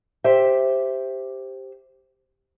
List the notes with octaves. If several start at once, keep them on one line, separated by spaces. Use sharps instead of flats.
G4 C5 E5